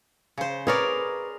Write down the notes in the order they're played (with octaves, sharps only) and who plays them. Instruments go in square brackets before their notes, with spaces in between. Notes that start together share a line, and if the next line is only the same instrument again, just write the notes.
[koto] C#3 C5
[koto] G#4 A#4 D5 [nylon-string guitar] B4 C#5